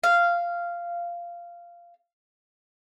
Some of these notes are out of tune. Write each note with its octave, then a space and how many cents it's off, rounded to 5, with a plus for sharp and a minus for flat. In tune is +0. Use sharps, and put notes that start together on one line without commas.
F5 -10